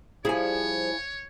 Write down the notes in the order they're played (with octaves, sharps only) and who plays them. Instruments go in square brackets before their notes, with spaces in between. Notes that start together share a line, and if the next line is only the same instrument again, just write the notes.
[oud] F3 G3 G#4 [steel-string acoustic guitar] E4 G#5 [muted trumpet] C#5